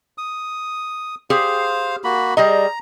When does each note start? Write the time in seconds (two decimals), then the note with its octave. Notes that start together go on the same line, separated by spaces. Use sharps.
0.18 D#6
1.30 G4 G#4 C5 F5
2.04 A#3 F#4 B5
2.37 G3 G#4 D#5 A#5